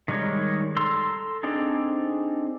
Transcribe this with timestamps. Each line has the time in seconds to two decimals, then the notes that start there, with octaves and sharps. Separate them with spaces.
0.08 D#3 G3 G#3 D#4 C#5
0.76 A4 A#5 C6 E6
1.43 C4 D4 D#4 G#4 A4